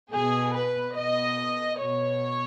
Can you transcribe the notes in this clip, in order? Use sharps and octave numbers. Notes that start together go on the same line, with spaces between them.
B2 G#4
B4
B2 D#5
B2 C#5